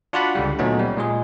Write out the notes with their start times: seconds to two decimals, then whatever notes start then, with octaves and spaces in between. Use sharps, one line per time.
0.13 D4 F4 F#4 D5 F#5 B5
0.35 C#2 D3 G3
0.59 A#2 F#3 A3 B3 C#4 D#4
0.79 G3
0.97 A#2 G#3 G#4